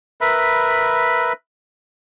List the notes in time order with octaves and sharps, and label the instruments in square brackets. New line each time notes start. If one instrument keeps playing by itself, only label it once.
[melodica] A#4 B4 E5 B5